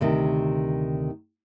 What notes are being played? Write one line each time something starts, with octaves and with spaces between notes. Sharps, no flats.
D2 C3 D#3